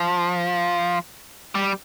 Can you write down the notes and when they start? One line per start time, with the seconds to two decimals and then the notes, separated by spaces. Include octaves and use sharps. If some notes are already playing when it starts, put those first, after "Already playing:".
Already playing: F3
1.55 G3